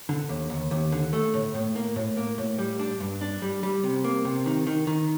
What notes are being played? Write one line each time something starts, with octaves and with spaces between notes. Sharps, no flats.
D3
D#2
D#2
D#2
D3
A3
A2
A2
A#3
A2
A#3
A2
G3
D4
G2
D4
G3
G3
C3
A#3
C3
D#3
D#3
D#3